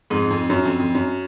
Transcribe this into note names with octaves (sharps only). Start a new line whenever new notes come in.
F2 G#2
F2
F#2
F2
F2
F#2